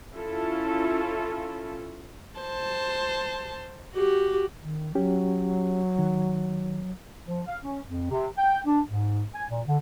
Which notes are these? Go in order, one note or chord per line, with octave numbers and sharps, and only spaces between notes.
C#4 E4 F4 A4
C5 A5
F#4 G4
D#3
F#3 C#4 G4
D#3
F3
F5
C#4
F2
C3
G5
D4
G#2
G#5
A#2
D3